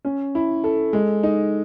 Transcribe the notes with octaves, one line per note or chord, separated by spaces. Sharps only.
C#4
E4
A4
G#3
D#4